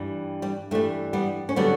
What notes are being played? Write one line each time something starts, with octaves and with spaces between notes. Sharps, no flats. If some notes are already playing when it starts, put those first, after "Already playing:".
Already playing: G2 E3 G3
G3
G2 E3 G3 A3
G3 B3
C#4
D3 F#3 G3 B3